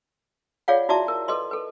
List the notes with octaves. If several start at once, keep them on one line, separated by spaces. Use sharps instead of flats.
F4 G#4 C#5 D5 F5 F#5
E4 F#4 D5 E5 A5 D6
A#4
A4 B4 D#5 C6
A4 B4